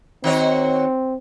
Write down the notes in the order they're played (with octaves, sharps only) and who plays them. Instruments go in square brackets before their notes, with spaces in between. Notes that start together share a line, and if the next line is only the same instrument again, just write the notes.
[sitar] D#3 F#4 C#5 [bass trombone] C4